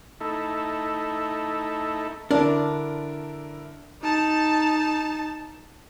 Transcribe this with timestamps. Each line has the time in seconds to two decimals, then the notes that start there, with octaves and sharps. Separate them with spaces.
0.21 A3 D#4 E4 A4
2.31 D3 D4 E4 A#4
4.02 D#4 A5